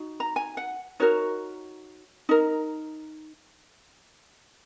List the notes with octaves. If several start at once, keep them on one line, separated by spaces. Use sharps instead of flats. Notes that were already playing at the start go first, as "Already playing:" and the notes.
Already playing: D#4 F#4
A#5
G#5
F#5
D#4 F#4 A#4 C#5
D#4 A#4